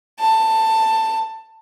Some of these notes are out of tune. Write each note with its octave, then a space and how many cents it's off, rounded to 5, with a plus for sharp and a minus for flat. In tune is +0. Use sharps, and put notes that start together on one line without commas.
A5 +15